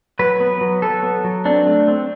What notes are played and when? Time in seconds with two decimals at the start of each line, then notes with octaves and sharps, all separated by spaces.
0.19 F#3 B4
0.40 B3
0.61 F#3
0.82 F#3 A4
1.03 B3
1.24 F#3
1.45 C4 D4
1.67 A3
1.88 C4